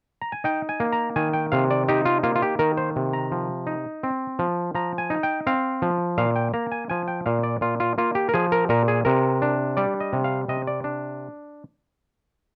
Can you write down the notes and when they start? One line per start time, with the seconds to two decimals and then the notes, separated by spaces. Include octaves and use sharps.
0.22 A#5
0.32 G#5
0.44 D#4 G5
0.69 G#5
0.80 A#3
0.93 A#5
1.16 D#3 G#5
1.33 G5
1.52 C3 F5
1.71 D5
1.88 D#4 G4
2.05 F4
2.23 A#3 F4
2.35 F4
2.42 G4
2.59 D#3 A#4
2.77 C5
2.96 C3
3.13 A#5
3.32 F3
3.67 D#4
4.03 C4
4.39 F3
4.75 F3 A#5
4.98 G#5
5.10 D#4
5.23 G5
5.47 C4 F5
5.82 F3
6.18 A#2 F5
6.36 G5
6.54 A#3 A#5
6.72 G#5
6.89 F3 G#5
7.08 G5
7.26 A#2 F5
7.43 D5
7.61 A#2 F4
7.80 F4
7.98 A#3 F4
8.15 G4
8.29 A#4
8.34 F3 G#4
8.52 A#4
8.69 A#2 A#4
8.88 G#4
9.05 C3 A#4
9.42 D4
9.77 G3 D5
10.00 D#5
10.13 C3
10.24 F5
10.48 C3 D#5
10.67 D5
10.84 D4